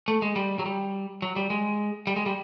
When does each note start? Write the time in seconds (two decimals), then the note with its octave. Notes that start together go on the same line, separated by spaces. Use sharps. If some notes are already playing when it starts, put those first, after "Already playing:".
0.08 A3
0.22 G#3
0.36 G3
0.59 F#3
0.65 G3
1.22 F#3
1.36 G3
1.50 G#3
2.07 G3
2.16 G#3
2.26 G3